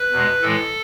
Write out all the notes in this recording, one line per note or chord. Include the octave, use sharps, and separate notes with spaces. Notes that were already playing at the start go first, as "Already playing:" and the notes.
Already playing: B4
E2 B2 G#3
A2 E3 G#3 A4